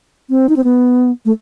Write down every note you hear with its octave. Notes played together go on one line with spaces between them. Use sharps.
C4
D#4
C4
B3
A3